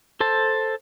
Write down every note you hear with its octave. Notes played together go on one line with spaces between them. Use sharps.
A4 C5 A5